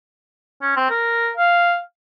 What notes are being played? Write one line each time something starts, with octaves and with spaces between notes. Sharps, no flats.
C#4
C4
A#4
F5